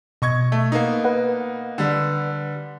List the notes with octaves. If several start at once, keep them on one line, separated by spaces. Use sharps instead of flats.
B2 D#5 C#6 G#6
A3
A#3 B3 D#4
B4 F#5
D3 G3